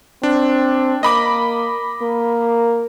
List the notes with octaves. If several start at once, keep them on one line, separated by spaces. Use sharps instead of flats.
C4 D4
A#3 D#5 B5 D6
A#3